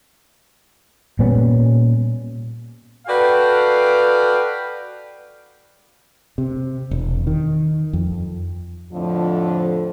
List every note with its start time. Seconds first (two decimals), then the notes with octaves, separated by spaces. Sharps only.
1.19 A#2 G3 B3 C#4
3.07 F#4 A4 B4 D5 F5 G5
6.38 C3
6.91 E1
7.27 D#3
7.93 F2
8.91 F2 A2 D3 F3